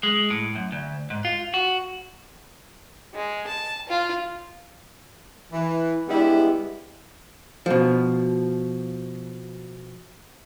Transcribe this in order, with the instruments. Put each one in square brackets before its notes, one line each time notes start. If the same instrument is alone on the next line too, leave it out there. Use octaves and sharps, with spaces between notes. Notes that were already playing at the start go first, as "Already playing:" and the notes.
[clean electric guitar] G#3
A2
F#2
D2
G#2
F4
F#4
[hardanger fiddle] G#3
A5
F4
[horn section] E3
G3 G#3 B3 D4 E4
[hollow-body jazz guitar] B2 F3